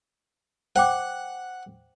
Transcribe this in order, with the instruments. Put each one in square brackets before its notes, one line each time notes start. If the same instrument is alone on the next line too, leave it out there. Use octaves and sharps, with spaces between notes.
[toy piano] C5 G5 D6 [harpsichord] F#5